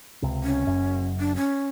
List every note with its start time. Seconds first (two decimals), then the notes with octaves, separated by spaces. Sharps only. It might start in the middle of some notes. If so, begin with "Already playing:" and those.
0.22 C#2 C3
0.44 C#4
0.67 F#1 F#2
1.20 D4
1.36 C#4